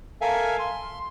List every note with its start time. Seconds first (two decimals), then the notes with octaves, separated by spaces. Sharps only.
0.21 A4 A#4 E5 F5 G#5
0.59 C6